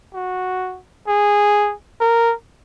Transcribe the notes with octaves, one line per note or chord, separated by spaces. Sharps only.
F#4
G#4
A#4